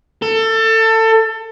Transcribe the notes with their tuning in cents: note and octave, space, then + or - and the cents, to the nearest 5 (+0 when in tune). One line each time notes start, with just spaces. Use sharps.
A4 +25